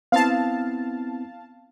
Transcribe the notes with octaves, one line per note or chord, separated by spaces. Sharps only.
B3 C4 E4 F5 A5